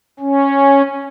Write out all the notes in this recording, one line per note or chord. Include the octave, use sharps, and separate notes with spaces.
C#4